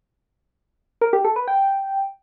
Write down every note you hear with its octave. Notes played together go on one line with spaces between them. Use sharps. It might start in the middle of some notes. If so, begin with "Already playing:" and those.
A#4
G4
A4
B4
G5